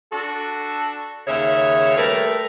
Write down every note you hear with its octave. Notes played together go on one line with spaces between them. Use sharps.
D4 F#4 A4
D#2 C#3 C#5 E5
G3 A3 A#4 B4